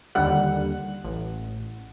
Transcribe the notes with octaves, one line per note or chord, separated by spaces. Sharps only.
D#2 D3 G3 F#5
A1